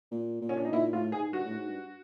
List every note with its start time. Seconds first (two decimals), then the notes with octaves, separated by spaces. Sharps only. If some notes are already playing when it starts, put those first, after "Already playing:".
0.12 A#2
0.42 A#2
0.49 C#4
0.57 D4
0.65 D#4
0.72 A#2 E4
0.92 A2 F4
1.12 G#2 G#4
1.33 G2 F#4
1.46 A2
1.58 G#2
1.69 G2